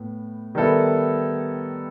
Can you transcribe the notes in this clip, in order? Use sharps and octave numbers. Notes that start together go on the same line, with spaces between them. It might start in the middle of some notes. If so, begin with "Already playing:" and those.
Already playing: A2 B3
D#3 G3 B3 E4 A4